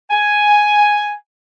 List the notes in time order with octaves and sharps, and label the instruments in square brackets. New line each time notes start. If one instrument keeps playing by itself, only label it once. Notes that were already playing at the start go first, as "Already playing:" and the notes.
[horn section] G#5